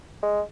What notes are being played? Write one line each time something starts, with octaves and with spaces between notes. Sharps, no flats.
G#3